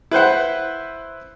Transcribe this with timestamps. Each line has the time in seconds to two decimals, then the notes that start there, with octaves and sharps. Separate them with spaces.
0.11 E4 B4 C5 F#5